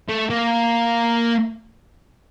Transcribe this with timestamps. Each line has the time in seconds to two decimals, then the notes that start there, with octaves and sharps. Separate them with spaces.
0.09 A3
0.30 A#3